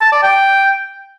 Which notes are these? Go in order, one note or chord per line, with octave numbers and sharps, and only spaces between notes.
A5
D5
G5